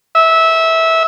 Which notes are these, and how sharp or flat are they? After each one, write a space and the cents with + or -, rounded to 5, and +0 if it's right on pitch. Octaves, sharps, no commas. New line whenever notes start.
E5 -20